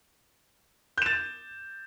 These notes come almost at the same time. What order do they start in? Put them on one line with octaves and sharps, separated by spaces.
G6 E7 A6